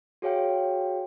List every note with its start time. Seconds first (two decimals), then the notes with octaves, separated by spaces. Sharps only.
0.22 F#4 G#4 C#5 F5 G5